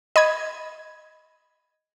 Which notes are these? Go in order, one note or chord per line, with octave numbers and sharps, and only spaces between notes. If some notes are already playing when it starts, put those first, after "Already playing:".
D#5 B5 G#6